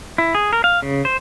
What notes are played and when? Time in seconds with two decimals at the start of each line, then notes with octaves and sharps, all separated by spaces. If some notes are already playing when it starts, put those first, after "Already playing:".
0.18 E4
0.35 G#4
0.53 A#4
0.64 F5
0.82 C#3
1.05 C5